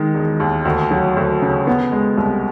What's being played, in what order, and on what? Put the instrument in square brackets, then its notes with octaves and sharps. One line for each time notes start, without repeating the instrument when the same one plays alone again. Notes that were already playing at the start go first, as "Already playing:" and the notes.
Already playing: [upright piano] D#3 G#3
E1
D#2
D2
F#3
D2
C#3
B3
G#3
C2